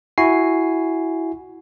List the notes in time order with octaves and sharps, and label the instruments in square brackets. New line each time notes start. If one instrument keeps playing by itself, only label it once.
[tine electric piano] E4 F#4 G#5 C7